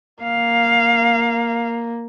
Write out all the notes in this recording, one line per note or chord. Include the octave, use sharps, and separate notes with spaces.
A#3 F5